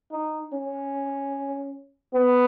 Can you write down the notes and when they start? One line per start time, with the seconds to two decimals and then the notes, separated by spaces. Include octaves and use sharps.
0.12 D#4
0.53 C#4
2.13 B3